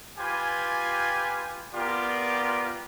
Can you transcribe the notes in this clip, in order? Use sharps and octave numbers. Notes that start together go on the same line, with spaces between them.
F4 G4 B4 G#5
B3 F4 G4 A#4 D5